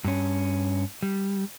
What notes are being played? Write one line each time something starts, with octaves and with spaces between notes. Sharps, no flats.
G2 C#4
G3